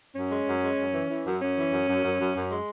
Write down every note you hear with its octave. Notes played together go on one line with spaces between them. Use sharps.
F#2 C#4
G#3
F#2
G#3
F#2
E3
E3
F#2
F#2 C#4
E3
F#2
F#2
F#2
F#2
F#2
G#3